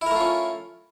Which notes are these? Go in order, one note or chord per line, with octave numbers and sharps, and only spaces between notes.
A3 C#4 E4 F4 A#4